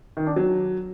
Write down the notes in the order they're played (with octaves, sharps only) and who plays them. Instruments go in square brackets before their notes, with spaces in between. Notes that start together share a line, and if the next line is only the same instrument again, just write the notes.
[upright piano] D#3
D4
F#3